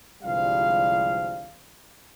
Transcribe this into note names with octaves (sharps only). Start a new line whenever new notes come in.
G1 C2 G#2 F3 G3 F5